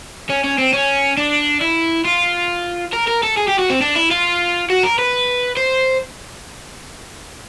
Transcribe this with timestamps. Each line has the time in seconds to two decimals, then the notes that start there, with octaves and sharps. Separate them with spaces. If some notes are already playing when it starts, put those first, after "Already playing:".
0.30 C#4
0.44 C#4
0.58 C4
0.73 C#4
1.17 D4
1.61 E4
2.05 F4
2.93 A#4
3.07 A#4
3.23 A4
3.37 G#4
3.48 G4
3.59 F#4
3.70 C4
3.82 D4
3.96 E4
4.11 F4
4.70 F#4
4.83 A#4
4.99 B4
5.57 C5